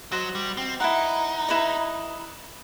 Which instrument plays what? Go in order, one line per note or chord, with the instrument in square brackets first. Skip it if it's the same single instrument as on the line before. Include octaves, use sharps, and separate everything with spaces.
[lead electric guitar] F#3 [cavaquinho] F#4 C5 D#5
[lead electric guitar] G3
C4
[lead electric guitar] D#4 [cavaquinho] E4 B4 F#5
[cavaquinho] E4 B4 D#5